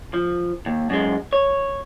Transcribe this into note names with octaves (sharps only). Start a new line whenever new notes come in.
F3
D#2
F#2 G#3
C#5